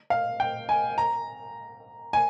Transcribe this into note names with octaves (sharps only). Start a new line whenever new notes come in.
F5
G5
G#5
A#5
G#5